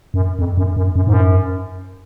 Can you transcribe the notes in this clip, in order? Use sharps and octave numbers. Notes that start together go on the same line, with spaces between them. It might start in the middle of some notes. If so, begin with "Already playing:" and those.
F#2
F2
F#2
F#2
F#2
G#2
F#2